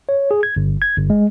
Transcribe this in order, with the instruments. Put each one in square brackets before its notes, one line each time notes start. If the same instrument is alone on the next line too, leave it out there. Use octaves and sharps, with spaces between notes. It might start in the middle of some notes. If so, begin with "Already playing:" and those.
[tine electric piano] C#5
G#4
G#6
G1
G#6
G1
G#3